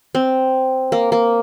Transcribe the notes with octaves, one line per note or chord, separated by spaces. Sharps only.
C4
A#3
A#3